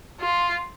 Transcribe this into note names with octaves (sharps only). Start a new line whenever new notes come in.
F4